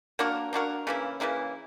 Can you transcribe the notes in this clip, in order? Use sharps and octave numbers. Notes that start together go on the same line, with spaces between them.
A#3 D4 F#4 A#4
A#3 D4 F#4 A#4
C#3 E3 A#3 E4
C#3 E3 A#3 E4